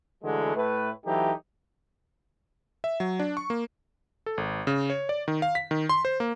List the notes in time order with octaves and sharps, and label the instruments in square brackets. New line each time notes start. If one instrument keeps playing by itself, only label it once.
[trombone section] D3 E3 F#3 G#3 A3
A2 A3 B4
E3 F#3 A3 D#4 G4
[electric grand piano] E5
F#3
D4
C#6
A#3
A4
G#1
C#3
C#5
D5
D#3
F5
B6
D#3
C6
C5
A#3